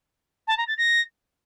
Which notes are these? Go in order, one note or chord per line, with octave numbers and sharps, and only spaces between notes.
A5
A#5
A6
A#6